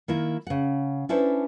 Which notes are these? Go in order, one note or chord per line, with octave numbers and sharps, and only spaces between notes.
D#3 A#3 E4
C#3 F#5
C#4 D4 E4 A4 B4 C5